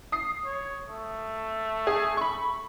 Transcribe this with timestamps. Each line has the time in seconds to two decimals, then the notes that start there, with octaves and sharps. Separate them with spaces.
0.12 D#6 C7
0.45 C#5
0.89 A3
1.87 G#4
2.17 B5 C#6